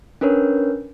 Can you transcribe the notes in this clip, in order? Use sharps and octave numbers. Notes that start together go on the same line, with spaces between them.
C#4 D4 A#4 B4 C#5